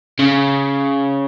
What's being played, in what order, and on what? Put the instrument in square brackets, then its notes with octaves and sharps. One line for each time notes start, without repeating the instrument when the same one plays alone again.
[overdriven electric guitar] C#3